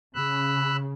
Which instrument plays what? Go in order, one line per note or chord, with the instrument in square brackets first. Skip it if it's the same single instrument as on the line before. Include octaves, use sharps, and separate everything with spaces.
[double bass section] C#3 [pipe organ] B5 E6 F#6